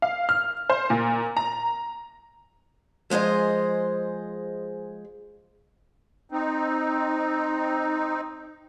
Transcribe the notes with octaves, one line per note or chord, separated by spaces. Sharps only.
F5
F6
C5
A#2
A#5
F3 G#3 G#4 C5 D#5
C4 D#4